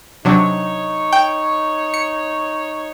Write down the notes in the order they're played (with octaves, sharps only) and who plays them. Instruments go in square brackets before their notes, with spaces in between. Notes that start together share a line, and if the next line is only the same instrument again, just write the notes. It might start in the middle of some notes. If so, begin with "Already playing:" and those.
[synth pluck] C3 F#3 D4 [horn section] D#4 C#5
[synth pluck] G5
C#7